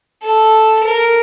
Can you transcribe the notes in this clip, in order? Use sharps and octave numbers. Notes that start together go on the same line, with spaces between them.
A4
A#4